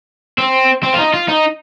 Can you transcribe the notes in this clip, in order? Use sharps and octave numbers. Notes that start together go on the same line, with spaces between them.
C4
C4
F4
D#4
F4
D#4